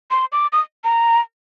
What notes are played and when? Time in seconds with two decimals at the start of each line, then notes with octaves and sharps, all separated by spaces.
0.11 C6
0.32 D6
0.53 D#6
0.84 A#5